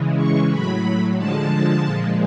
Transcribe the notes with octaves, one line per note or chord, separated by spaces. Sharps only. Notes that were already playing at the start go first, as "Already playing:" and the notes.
Already playing: C#3 E3 G#3
C#6
A2 F#3 B5
D3 F3 G#3 A5
A#2 F3 G#3